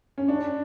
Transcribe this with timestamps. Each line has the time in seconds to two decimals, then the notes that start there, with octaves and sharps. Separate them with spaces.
0.18 C#4
0.28 D4